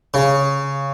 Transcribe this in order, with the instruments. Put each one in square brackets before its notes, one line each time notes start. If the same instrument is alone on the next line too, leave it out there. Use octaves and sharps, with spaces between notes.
[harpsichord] C#3